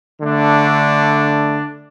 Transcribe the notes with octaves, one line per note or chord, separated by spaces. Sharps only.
D3 A3 D4